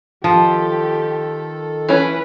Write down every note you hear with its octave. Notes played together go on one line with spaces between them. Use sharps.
D#3 F3 G4 A4
E3 C#4 E4 B4